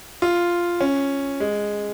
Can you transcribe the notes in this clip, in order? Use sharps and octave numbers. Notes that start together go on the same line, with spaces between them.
F4
C#4
G#3